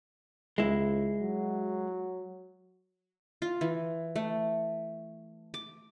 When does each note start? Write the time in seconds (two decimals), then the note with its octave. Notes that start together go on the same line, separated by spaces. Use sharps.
0.58 C#2 G#3 E4
1.22 F#3
3.42 F4
3.61 E3
4.16 A3
5.54 D6